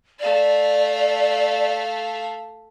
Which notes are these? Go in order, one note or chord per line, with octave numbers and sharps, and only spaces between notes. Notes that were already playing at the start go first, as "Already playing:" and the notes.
A3 D5 F5